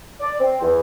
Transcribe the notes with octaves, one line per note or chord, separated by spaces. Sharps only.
D5
C4
E2